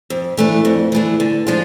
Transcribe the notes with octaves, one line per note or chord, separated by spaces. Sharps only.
F2
E3 A3 D4
F2
E3 A3 D4
D3
F3 G#3 D4 F4